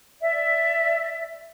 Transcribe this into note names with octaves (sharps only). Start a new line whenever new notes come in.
D5 E5